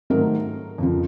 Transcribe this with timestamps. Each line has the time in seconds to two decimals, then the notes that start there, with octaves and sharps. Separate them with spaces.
0.10 G#2 D#3 F#3 A3 A#4
0.78 F2 C#3 F3